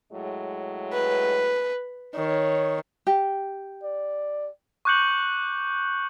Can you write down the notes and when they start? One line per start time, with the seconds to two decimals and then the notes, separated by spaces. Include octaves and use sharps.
0.12 A2 F#3 G#3
0.94 B4
2.15 D#3 C#5
3.07 G4
3.83 D5
4.85 C#6 D6 F#6 G6 C#7 F#7